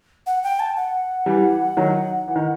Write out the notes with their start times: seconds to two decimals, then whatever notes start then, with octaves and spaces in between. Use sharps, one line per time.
0.27 F#5
0.44 G5
0.60 A5
0.76 F#5
1.26 E3 G3
1.77 D#3 F#3
2.28 E3
2.36 D#3